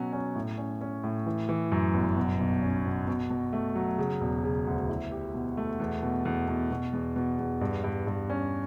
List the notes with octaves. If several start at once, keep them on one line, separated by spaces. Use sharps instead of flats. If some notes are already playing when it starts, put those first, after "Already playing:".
Already playing: B2 F#3 C#4
C#4
A2
C#4
C#4
A2
E3
E3
F#2
G1
B2
B1
C#4
B2
B2
B2
A3
F#3
C#3
E1
C#3
D2
E4
G4
B2
A3
E2
B2
E2
B2
B2
E2
B2
E2
G2
G2
G2
C#4